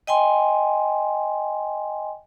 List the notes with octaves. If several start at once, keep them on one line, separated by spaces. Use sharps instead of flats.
D#5 G5 G#5 C6